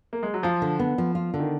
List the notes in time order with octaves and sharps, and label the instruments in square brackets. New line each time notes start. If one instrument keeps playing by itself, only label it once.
[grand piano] A#3
G#3
F#3
[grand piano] F3 [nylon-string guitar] F4
[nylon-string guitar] D3
B3
F3
F4
D3
[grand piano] D#3